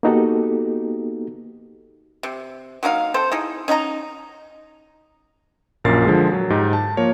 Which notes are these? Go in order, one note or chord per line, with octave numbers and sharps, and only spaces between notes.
A#3 B3 D#4 F#4 G4 A4
C3
F#3 A#3 D#4 F5
C4 A4 C5
D#4 E4 G#4
C#4 D#4 F#5 A#5
A#1 F#2 A#2 A#4 A6 C7
D3 F3 G#3 G#4
F#3
G#2 D#4 G4
A5
F3 A#3 A#4 C#5